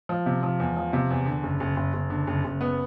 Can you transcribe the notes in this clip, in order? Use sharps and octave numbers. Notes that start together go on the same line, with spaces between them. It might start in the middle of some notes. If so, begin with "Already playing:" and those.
F3
C3
F3
E2
F3
C3
E2
D3
F#1
F#1
F#1
F#1
D3
F#1
F#1
B3